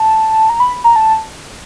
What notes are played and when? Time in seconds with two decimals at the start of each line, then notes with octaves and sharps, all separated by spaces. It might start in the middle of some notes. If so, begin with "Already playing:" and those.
Already playing: A5
0.49 A#5
0.60 B5
0.84 A#5
0.96 A5